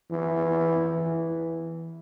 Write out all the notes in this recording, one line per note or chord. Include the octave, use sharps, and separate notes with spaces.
E3
E3